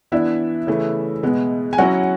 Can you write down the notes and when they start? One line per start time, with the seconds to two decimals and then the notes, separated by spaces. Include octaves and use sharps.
0.12 E3 B3 D4 E4 E5
0.67 C#3 E3 A3
1.23 B2 G#3 B3
1.73 G#5
1.78 F#3 C#4 E4 F#4 F#5